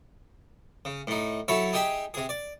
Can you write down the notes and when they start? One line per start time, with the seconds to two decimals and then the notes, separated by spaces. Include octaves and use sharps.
0.85 C#3
1.07 A2 D#4
1.48 F#3 E4 A4 C#5 E5 B5
1.73 D#4 G4 G#4 E5 G5
2.14 C3 G#4
2.29 D5